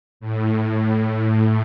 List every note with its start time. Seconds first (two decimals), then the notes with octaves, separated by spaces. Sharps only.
0.20 A2